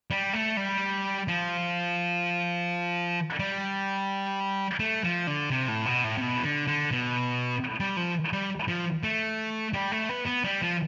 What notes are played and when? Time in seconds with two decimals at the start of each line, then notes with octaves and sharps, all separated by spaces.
0.11 G3
0.33 A3
0.57 G3
1.28 F3
3.39 G3
4.79 A3
5.04 F3
5.27 D3
5.50 C3
5.68 A2
5.86 B2
6.04 A2
6.17 C3
6.21 B2
6.37 E3
6.45 D3
6.67 D3
6.91 B2
7.80 G3
7.97 F3
8.33 G3
8.68 F3
9.03 A3
9.73 G3
9.92 A3
10.09 B3
10.26 B3
10.44 G3
10.61 F3